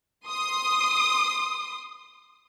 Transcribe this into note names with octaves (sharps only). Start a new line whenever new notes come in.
C6 D#6